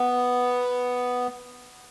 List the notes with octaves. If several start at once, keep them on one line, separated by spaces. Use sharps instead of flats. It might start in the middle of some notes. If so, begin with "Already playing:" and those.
Already playing: B3